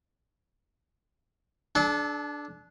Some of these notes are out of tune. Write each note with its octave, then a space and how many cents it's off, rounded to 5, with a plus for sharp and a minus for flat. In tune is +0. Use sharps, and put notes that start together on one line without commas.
D4 +0 A4 -40